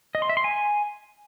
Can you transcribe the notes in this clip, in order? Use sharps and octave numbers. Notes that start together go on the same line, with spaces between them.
D#5
C6
E5
C6
G#5